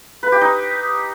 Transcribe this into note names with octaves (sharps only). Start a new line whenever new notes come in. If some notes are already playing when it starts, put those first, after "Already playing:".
B4
G4
D#4